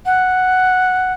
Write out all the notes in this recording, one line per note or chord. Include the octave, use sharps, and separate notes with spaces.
F#5